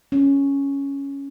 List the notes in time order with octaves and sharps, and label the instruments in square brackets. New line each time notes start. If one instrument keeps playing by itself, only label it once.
[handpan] C#4